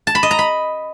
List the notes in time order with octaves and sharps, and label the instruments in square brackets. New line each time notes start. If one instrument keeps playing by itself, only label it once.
[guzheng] A5
B5
D#5
A#5
B5